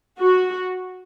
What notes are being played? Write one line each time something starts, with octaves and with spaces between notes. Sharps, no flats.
F#4